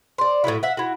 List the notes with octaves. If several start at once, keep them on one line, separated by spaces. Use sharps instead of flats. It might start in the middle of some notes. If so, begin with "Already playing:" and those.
C5 D5
A2 D#3 F#3 E4
E5 F#5
E4 F#4